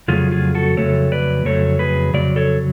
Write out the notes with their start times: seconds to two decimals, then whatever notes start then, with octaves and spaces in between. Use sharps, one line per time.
0.08 F2 C#3 F#3 A3 F4 G#4
0.32 F4 G#4
0.55 F#4 A4
0.77 F2 C#3 F#3 A3 A4 C#5
1.12 B4 D5
1.45 F2 C#3 F#3 A3 A4 C#5
1.79 G#4 B4
2.13 F2 C#3 F#3 D5
2.36 A4 C#5